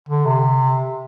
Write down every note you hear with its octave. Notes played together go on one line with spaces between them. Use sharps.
D3
C3